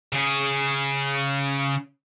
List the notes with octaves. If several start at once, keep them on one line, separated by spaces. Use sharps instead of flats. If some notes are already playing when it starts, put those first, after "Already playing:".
C#3 G#4